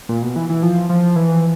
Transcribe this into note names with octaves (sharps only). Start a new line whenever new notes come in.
A#2
B2
E3
E3
F3
F3
E3